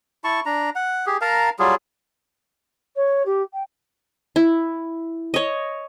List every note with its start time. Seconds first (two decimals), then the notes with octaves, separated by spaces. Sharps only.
0.24 E4 A5 C#6
0.46 D4 A#5
0.75 F#5
1.06 G4 G#4
1.21 A#4 F5 A5 A#5
1.59 F#3 G3 F4 G#4
2.96 C#5
3.25 G4
3.53 G5
4.36 E4
5.34 C#5 D#5